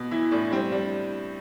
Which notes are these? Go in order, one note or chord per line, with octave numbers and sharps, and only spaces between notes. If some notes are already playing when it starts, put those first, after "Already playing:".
Already playing: B2
E3 E4
A2 D4
G3 C4
G3 D4